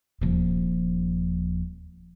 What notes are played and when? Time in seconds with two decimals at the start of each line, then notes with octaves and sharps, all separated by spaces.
0.21 D#1 F3